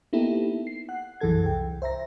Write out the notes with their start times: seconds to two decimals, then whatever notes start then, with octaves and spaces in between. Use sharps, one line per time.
0.13 A#3 B3 D#4 E4 G4 A4
0.67 C7
0.89 F#5 F#6
1.21 B1 F#2 E3 G#4 A4 G#6
1.43 C2 G5
1.82 C5 E5 A#5 A#6